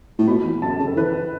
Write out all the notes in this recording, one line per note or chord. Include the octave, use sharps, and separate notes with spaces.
A2
B2 B5
E2
F#2 A5
C#3
A4
E3 B4